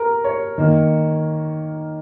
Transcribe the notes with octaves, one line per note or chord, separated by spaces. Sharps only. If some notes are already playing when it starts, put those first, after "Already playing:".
Already playing: A#4
C#5
D#3 A#3